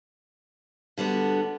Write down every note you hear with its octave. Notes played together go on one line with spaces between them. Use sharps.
D3 G3 B3 F#4